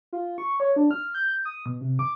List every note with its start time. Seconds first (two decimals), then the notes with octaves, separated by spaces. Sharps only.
0.13 F4
0.38 C#6
0.60 C#5
0.76 D4
0.91 F6
1.15 G6
1.45 D#6
1.66 B2
1.81 C3
1.99 D6